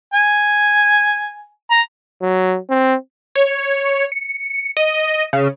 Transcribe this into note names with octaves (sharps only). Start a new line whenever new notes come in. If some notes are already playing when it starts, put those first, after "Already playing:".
G#5
A#5
F#3
C4
C#5
C#7
D#5
C#3